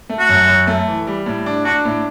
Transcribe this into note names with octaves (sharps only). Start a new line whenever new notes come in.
A3
F#4
F#2
F#2
A3
E3
G3
A2
D4
D4 F#4
A2